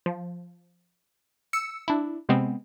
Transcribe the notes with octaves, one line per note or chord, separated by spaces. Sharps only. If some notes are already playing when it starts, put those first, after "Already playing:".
F3
E6 C#7
D4 E4
C3 G#3 B3 C4